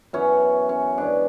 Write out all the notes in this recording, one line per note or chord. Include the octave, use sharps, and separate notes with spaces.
F#2 E3 B3 C#4
C#4
G#2 E3 B3 D4